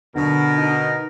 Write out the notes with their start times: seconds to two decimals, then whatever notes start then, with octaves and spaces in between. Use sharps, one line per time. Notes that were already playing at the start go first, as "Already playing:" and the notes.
0.15 B2 D3 A#4
0.58 D#4